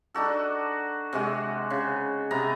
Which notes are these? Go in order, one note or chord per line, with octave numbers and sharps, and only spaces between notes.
D4 D#4 F#4 A4
C3 G#3 F#4
C#3
C3 B3 A#5